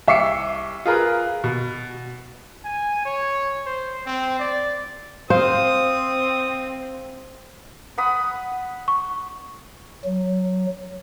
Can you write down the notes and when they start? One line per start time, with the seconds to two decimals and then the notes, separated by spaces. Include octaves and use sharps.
0.08 C2 E5 C#6 D6 C7 C#7
0.86 F4 G#4 A#4 B4
1.44 B2
2.65 G#5
3.05 C#5
3.66 C5
4.06 C4
4.39 D5
5.30 C4 C5 F5 D#6
7.98 F#5 B5 D#6
8.88 C#6
10.04 F#3